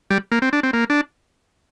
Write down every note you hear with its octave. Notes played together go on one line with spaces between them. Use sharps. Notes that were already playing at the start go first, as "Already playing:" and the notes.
G3
A#3
C4
D4
C4
A#3
D4